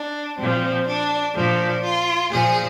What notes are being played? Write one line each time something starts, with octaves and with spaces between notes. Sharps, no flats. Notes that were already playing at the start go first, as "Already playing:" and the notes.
Already playing: D4
A#2 F3 C4
D4
A#2 F3 D4
F4
A#2 F3 G#4